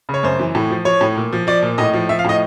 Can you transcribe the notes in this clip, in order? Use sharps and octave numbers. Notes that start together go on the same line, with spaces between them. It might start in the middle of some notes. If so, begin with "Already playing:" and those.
C#3
C#5
F#2 C5
E3
A2
F3
F3 C#5
A2
A#2
F3
F3 D5
A#2
A2 D#5
F3
F3 E5
F5
A2 D#5